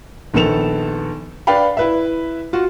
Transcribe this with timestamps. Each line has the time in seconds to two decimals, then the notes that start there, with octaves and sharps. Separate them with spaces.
0.34 A#1 D#3 B3 A4 E7 F7
1.47 D4 B4 D5 F5 G5 B5
1.77 E4 B4 E5
2.53 F4 F#4